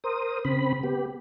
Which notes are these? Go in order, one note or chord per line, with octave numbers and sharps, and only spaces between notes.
A#4 C5 D#6
C#3 C4 B5
B3 G4